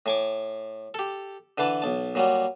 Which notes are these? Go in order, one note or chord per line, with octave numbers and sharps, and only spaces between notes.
A2 G#5 D6
G4 A4
D3 E3 B4 A5
B1 A5
A#2 F#3 G3